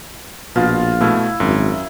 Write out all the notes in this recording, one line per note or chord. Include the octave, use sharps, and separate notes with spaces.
A#1 B2 F4
B2 A3 E4
G#1 F#2